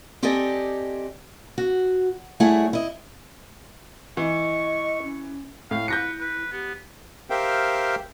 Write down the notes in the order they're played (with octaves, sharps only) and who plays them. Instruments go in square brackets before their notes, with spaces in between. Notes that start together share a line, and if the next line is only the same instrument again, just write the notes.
[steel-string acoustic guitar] C4 G4 A4 D5 D#5 G#5
F#4
G3 A3 E4 G#4 C#5 F#5
E4 D#5
[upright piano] E3 [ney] D#5 [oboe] C#6
[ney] C#4
[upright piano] A2 [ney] E4 [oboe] F5
[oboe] B4 [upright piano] G6 A#6 C#7
[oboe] B4
[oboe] B3 [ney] G4
[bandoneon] G4 A#4 C5 E5 F5 G5